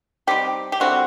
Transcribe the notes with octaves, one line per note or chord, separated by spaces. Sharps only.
G3 C4 D#4 G4
G4
D3 G3 C4 E4 F#4